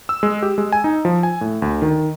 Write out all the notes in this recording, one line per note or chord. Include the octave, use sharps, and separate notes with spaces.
E6
G#3
G4
G#3
G#5
D#4
F3
G#5
A2
D2
D#3